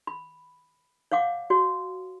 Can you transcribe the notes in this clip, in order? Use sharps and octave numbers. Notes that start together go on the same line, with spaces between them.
B5
C#5 F5 F#5 D6
F#4 C#5